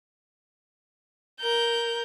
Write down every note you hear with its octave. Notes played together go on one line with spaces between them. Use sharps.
A#4 G6